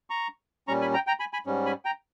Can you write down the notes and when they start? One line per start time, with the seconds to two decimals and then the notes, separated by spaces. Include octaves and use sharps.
0.10 A#5 C#6
0.68 A#2 G3 C#4 A#5 C#6
0.81 G#5 B5
0.94 G5 A#5
1.07 G5 A#5
1.20 G#5 B5
1.33 G#5 B5
1.46 G#2 G3 C#4
1.66 G#5 B5
1.85 G5 A#5